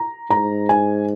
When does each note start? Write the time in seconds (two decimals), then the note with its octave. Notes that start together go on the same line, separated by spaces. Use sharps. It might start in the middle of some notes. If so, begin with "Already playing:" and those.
Already playing: A#5
0.30 G#2 A#5
0.69 G#5